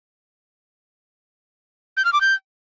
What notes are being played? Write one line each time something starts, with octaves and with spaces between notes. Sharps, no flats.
G6
F6
D6
G6